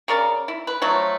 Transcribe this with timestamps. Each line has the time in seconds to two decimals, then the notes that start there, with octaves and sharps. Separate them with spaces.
0.08 C#3 A#4 D5
0.48 E4
0.67 B4
0.82 F3 F#3 A3